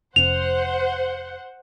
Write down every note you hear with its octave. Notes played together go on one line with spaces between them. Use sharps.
F1 C#4 C5 F#5 F7